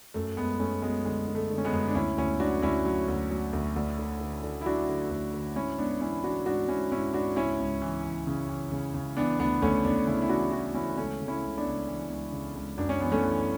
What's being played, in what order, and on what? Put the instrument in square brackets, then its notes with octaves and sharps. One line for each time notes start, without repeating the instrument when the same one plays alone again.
[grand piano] F#2 A3
F#2 G#3 B3
F#2 A3 C#4
F#3 G#3 B3
D3 G#3
D3
A3
D3
C#4
G#3 B3
F#2
D4
D2 C#4 E4
D2 C#4 E4
F#3 D4 F#4
D2 C#4 E4
F#3
D2
F#3
D2
D2
D3
D3
D3
E4
F#3 D4 F#4
D3
D2
D3
G#2 C#4 E4
G#2 B3 D4
E3 C#4 E4
E3 D4 F#4
G#2 D4 F#4
G#2 C#4 E4
G#2 C#4 E4
G#2 D4 F#4
C#2 C#4 E4
C#2
E3
E3
C#3
E3
C#3
C#3
E3 B3 D4
D2 B3 D4
D2 A3 C#4
D2 B3 D4
C#3 C#4 E4
E4
E3 D4 F#4
E3 D4 F#4
E3 C#4 E4
C#2 A3 C#4
C#3
C#4 E4
C#2
B3 D4
C#2
E3
C#2
C#3
C#2
F#2 D4
C#4
E3 B3
A3 C#4
E3